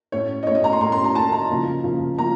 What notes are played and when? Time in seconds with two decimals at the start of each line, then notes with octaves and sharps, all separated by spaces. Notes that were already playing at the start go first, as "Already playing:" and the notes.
0.12 A2 A3 C#4 C#5
0.43 D#5
0.47 A2 A3 C#4 C#5
0.55 D#5
0.64 A#5
0.73 C6
0.81 A2 A3 C#4 A#5
0.92 C6
1.04 A#5
1.15 A2 A3 C#4 A5
1.32 A#5
1.49 C#3 F3 A#3
1.84 C#3 F3 A#3
2.18 F3 A#3 A#5